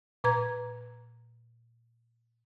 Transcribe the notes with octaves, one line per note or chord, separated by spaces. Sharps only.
A#2 B4 A#5 G#6